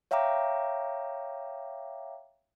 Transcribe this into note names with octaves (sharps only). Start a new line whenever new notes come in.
C#5 E5 F5 G5 A#5 D6